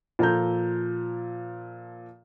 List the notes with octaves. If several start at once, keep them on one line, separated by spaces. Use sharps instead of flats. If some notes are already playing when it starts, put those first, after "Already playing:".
A#2 F3 A4 A#5 G6